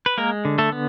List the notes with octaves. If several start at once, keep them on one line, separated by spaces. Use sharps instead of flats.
B4
G#3 A#3 A#4
D3
A3 A4
B3